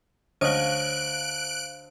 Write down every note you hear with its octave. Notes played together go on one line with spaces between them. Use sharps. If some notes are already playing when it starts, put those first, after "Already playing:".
D2 C5 C#5 D#5 F5 F#6 D7